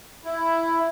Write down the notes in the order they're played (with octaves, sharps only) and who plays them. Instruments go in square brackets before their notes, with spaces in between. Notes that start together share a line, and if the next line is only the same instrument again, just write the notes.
[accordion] E4